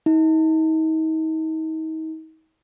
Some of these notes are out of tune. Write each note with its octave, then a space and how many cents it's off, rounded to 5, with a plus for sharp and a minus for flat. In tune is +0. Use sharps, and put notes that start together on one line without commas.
D#4 +35